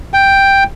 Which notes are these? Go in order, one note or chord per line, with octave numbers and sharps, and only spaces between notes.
G5